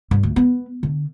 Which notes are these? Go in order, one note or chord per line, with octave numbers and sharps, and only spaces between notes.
G2
D2
B3
D3